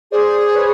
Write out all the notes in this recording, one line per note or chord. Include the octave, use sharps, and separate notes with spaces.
G#4 C5 D5
B4 C#5